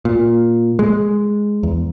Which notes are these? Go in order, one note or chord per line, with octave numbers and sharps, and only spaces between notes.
A#2
G#3
E2